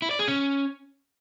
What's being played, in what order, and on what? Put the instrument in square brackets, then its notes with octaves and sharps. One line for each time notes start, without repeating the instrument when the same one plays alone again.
[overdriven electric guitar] E4
D5
G#4
C#4